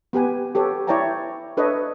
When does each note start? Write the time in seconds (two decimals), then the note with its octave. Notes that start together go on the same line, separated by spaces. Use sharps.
0.13 B3 G4 B4 G#5
0.55 G4 A4 B4 C#5
0.87 E4 C#5 D5 G5 A5 A#5
1.57 D4 A4 B4 C#5 D#5 E5